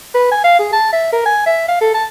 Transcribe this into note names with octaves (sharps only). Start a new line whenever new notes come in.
B4
G#5
F5
G#4
A5
E5
A#4
G#5
E5
F5
A4
A5